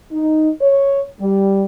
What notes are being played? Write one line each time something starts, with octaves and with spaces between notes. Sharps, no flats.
D#4
C#5
G3